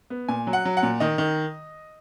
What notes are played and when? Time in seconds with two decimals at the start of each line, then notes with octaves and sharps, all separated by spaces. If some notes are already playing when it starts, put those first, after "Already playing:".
0.10 B3
0.28 A#2 G#5
0.47 F#3
0.53 F#5
0.65 F#3
0.77 F#5
0.83 A#2
1.00 D#3 D#5
1.18 D#3